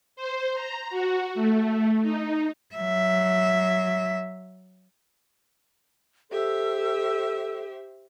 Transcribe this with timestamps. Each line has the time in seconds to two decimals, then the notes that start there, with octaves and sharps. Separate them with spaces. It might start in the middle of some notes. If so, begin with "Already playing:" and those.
0.16 C5
0.54 A#5
0.90 F#4
1.35 A3
2.02 D#4
2.75 F#3 E5
6.31 G4 A4 C5 E5